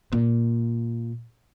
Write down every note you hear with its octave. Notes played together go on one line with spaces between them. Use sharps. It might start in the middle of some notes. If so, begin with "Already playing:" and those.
A#2